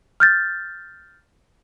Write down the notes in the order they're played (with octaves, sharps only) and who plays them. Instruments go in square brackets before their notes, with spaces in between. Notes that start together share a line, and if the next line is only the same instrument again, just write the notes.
[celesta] F6 G6 A6